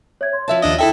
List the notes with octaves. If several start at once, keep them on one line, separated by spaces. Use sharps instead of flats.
C#5 E5 G#6
C6
F3 C#5 E5 A5
D#2 D4 D#5
E4 A4 E5 G5